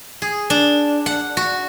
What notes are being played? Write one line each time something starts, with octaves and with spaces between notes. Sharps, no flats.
G#4
D4
F#5
F#4